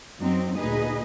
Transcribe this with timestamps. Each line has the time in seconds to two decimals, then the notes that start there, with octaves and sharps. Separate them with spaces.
0.19 F#2 F#3 C4 D#4
0.57 D2 A#2 D#4 G#4 B4 D#5